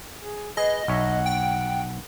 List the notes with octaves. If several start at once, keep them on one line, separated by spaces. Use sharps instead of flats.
G#4
G#4 B4 D#5
B1 C#5 E5 F#5
G5